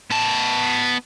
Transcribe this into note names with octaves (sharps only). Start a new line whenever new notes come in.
B3 A5